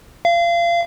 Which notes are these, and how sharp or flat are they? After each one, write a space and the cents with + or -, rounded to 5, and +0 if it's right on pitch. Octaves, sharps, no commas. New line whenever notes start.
F5 -30